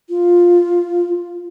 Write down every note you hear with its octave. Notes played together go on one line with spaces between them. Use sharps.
F4